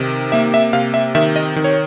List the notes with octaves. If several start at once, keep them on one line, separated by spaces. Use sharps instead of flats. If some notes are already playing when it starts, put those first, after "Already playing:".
Already playing: C3 D#3
A#3 E5
E5
C3 F5
E5
D#3 E5
D#5
D#3
C#5